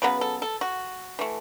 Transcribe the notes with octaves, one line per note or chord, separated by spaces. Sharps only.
C#3 F#3 B3 B4
A4
A4
F#4
E3 A3